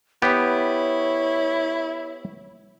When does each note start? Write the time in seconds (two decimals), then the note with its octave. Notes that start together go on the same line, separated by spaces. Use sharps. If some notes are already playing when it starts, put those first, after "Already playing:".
0.22 B3 E4 G4 C#5